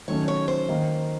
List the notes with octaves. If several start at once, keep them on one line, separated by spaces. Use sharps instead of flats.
D#3 F#3 A3 C#4 C#5
C#5
C5
D#3 A#3 D#4